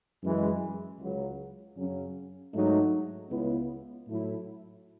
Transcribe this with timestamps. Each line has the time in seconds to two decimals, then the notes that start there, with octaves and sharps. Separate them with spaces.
0.23 F#2 E3 G#3
0.99 C#2 C#3 F#3
1.76 F#2 C#3 F#3 C#4
2.52 G#2 F#3 A3 D#4
3.30 C#2 C#3 G#3 B3 E4
4.06 A2 F#3 A3 E4